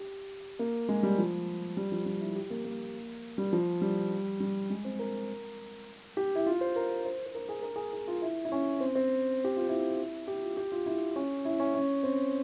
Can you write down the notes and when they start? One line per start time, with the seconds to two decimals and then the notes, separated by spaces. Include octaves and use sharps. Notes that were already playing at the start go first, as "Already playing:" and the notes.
Already playing: G4
0.59 A#3
0.89 G#3
1.03 G3
1.18 F3
1.77 G3
1.92 F3
2.06 G3
2.21 E4
2.36 G4
2.50 A#3
2.65 A#3
3.38 G3
3.53 F3
3.82 G3
4.40 G3
4.70 G#3
4.85 C4
4.99 A#4
6.17 G4
6.35 E4
6.46 F4
6.61 C5
6.76 A#4
7.05 C5
7.26 C5
7.35 A#4
7.49 G#4
7.62 A#4
7.76 G#4
7.93 G#4
8.08 F4
8.22 E4
8.45 E4
8.52 C#4
8.80 C4
8.95 C4
9.44 G4
9.57 F4
9.69 E4
10.28 G4
10.42 F4
10.57 G4
10.72 F4
10.86 E4
11.16 C#4
11.45 E4
11.60 C#4
11.74 C#4
12.03 C4